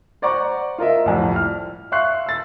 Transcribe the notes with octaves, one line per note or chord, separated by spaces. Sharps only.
C5 D5 F#5 A#5 C#6
F4 A#4 D#5 E5
C2 F2 A2
F6
E5 F5 C6 C#6 F#6 C7
E6 A6